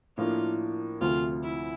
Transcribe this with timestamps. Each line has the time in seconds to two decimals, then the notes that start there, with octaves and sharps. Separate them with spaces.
0.18 A2 F3 A#3 D4 F4
1.01 D2 C3 F3 A3 F4
1.44 E4